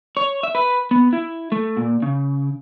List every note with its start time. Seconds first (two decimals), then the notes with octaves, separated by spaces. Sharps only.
0.17 C#5
0.43 E5
0.55 B4
0.91 B3
1.13 E4
1.52 A3
1.77 A#2
2.02 C#3